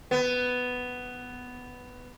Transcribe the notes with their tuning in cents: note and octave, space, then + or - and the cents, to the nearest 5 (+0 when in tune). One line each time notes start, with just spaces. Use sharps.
B3 +10